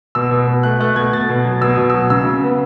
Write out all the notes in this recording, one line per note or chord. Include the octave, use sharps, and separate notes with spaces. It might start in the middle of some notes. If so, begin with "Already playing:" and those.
B2 E6
B2
B2
A3 F#6
A3 F#6
B2 G#6
B2 A6
B2
F#3
B2 E6
B2 D#6
F#3 E6
C#3 E6
C#3
B3